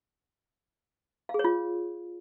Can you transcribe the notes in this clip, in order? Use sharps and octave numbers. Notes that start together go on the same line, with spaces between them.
F5
G#4
C#5
F4